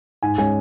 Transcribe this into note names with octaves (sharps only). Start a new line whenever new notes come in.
G#2 G#5
G#3 C#4 G#5